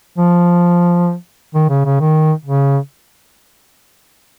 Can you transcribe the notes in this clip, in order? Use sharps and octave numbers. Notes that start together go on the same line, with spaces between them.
F3
D#3
C#3
C#3
D#3
C#3